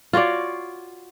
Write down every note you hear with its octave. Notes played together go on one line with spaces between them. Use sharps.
F4 F#4 C#5 D5